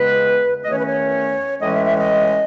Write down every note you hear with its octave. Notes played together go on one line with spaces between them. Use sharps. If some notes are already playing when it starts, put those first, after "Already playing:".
Already playing: E2 C#3 G#3 B3 B4
E2 D#3 A3 C#4 D#5
C#5
B4
C#5
A2 E3 G#3 C#4 D#5
E5
E5
D#5